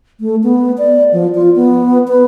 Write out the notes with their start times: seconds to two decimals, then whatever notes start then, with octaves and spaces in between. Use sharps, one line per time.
0.20 A3
0.43 B3
0.78 D5
1.13 F3
1.35 F4
1.56 B3
2.08 B4